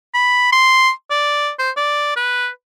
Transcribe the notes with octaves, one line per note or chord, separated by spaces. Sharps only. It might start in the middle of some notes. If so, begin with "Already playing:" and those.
B5
C6
D5
C5
D5
B4